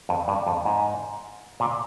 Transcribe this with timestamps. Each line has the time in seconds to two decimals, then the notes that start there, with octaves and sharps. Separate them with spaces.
0.09 F2
0.28 G2
0.47 F2
0.65 G#2
1.60 A#2